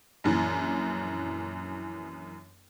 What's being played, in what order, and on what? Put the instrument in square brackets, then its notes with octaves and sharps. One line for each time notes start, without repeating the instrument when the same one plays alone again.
[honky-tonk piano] A#1 F#2 E3